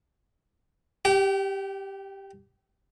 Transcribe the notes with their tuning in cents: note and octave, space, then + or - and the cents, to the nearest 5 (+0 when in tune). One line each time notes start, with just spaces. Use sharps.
G4 +0 G5 -35